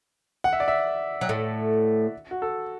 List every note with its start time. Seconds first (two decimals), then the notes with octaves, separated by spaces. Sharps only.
0.44 F#5
0.53 E5
0.60 D5
0.68 E5
1.21 F#3
1.29 A2 A3
2.31 F#4
2.42 A4